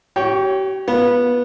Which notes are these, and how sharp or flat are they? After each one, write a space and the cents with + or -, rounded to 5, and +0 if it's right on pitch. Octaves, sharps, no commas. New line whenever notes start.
G4 -45 C#5 +0 G5 +0
B3 -15 F4 +0